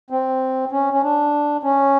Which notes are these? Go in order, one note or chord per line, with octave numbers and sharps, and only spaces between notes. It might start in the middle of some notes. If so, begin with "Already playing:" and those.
C4
C#4
C#4
D4
C#4